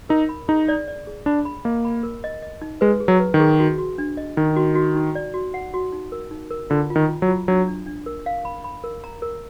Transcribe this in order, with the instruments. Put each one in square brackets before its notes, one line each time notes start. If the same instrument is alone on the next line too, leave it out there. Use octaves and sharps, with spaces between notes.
[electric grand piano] D#4 [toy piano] A#4
[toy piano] B5
[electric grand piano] D#4 [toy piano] G#4
[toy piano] D5
D5
G#4
[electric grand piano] D4 [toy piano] B5
[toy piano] B5
[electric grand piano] A#3 [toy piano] D#5
[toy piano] B5
A#4
D#5
D#5
D#4
[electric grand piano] G#3 [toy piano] B4
[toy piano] G#4
[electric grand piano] F#3
[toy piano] B4
[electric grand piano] D#3
[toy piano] G#4
F#4
F#4
D4
D#5
[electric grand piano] D#3 [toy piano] D#4
[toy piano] F#4
F#4
D#4
D5
F#4
F#5
F#4
D#4
A#4
D#4
A#4
[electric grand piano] D3 [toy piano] F4
[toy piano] F4
[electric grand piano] D#3
[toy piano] F4
[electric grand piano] F#3
[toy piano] F4
[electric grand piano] F#3 [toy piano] D4
[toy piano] D4
D4
A#4
F5
B5
B5
A#4
A#5
A#4